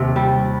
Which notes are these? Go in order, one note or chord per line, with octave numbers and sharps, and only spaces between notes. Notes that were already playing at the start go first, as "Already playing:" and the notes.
Already playing: D#2 C3
G3